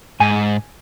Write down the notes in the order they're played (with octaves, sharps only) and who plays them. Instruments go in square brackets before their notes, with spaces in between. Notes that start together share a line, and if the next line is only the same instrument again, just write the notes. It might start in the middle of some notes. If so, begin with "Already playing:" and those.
[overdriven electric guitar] G#2 [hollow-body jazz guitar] G#5